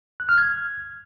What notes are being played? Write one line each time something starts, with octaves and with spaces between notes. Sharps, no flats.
F#6
F6
G#6